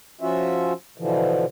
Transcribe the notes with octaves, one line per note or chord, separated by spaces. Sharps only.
F3 C#4 F4 F#4 E5
B2 D3 E3 F3